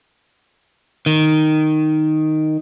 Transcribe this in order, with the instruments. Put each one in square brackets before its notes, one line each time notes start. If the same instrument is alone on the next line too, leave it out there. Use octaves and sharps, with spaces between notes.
[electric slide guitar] D#3